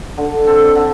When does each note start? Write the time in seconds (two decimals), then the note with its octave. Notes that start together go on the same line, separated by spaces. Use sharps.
0.17 D3
0.47 C4 A4
0.75 D3